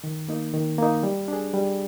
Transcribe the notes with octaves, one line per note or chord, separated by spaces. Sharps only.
D#3
A#3 D#4
D#3
A#3 D#4
G3
D4 G#4
G3